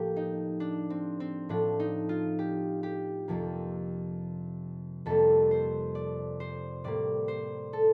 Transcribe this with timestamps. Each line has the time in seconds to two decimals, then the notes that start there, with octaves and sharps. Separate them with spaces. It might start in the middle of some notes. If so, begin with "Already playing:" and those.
Already playing: A2 F3 A#3 G4
0.16 D#4
0.60 D4
0.90 C4
1.20 C4
1.49 A2 F3 A3 D4
1.80 D#4
2.09 F4
2.39 G4
2.83 G4
3.28 F2 C3 F3 A#3
5.06 F2 C3 G3 A#3 A4
5.51 C5
5.95 D5
6.40 C5
6.84 A2 G3 A#3 D5
7.28 C5
7.73 A4